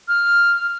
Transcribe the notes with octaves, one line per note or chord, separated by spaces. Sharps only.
F6